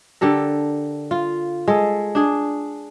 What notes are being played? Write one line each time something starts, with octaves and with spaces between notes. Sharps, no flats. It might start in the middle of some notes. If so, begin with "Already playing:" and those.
D3 G4 A4 A#4
F4
G#3 A4
D4 G#4